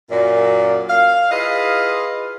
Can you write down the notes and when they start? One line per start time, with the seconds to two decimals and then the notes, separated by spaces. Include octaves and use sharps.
0.11 F#2 A#2
0.89 F5
1.31 E4 F4 G#4 B4 D#5 F5